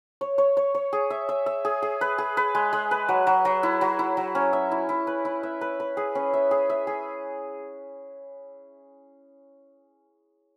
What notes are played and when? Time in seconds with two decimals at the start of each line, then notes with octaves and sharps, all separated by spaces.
0.21 C#5
0.38 C#5
0.57 C#5
0.75 C#5
0.93 G#4
1.10 E5
1.29 E5
1.46 E5
1.65 G#4
1.82 G#4
2.01 B4
2.18 G#4
2.37 B4
2.55 G#3
2.73 G#3
2.91 B4
3.09 F#3
3.27 F#3
3.45 F#3
3.63 E4
3.81 F#3
3.99 E4
4.17 F#3
4.35 C#4
4.53 E5
4.71 E4
4.89 E4
5.07 B4
5.25 E4
5.43 E5
5.61 B4
5.80 B4
5.97 G#4
6.15 C#4
6.34 E5
6.51 G#4
6.70 E5
6.87 G#4